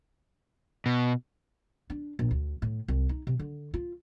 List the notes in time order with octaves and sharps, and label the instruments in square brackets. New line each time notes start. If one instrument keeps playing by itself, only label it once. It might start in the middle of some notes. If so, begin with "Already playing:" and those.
[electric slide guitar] B2
[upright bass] D4
A#1
D2
A2
C2
D#4
C3
D3
F4